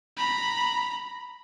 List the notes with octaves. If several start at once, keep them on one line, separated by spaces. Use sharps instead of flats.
A#5 B5